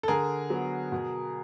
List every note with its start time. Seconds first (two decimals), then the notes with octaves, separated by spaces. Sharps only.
0.03 A4
0.08 D3 G#4 A#4
0.50 F#3 B3
0.92 B2